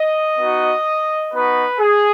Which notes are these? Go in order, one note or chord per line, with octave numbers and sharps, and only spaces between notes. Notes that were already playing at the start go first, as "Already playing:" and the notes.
Already playing: D#5
B3 D#4 F#4
B3 D#4 F#4 B4
G#4